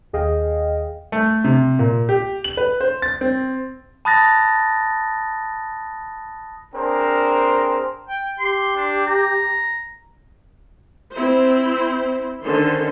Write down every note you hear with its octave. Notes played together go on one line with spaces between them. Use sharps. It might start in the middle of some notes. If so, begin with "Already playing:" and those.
D#2 G#4 D#5 F5 G5
A3
C3
A#2
G4
F#7
B4
C5
A6
C4
A5 B5 D#6 F#6 A6 A#6
C4 D4 G#4 A#4 C5
G5
G4 C6
D4
A#5
C4 E4 C5
D3 D#3 C#4 A4 C5 C6